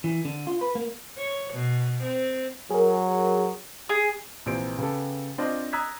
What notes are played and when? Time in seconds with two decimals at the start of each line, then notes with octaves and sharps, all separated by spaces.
0.04 E3
0.25 D3
0.47 F4
0.61 B4
0.75 A#3
1.18 C#5
1.53 B2
2.03 C4
2.70 F#3 G#4 A#4
3.89 G#4
4.46 A#1 C3 E3 C5 D7
4.78 C#3 B3 G4 A4
5.38 C4 D4 F4 C5 D#5
5.73 A#5 D#6 E6 F#6 G#6 B6